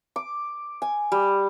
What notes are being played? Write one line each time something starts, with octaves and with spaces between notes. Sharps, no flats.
D6
G#5
G3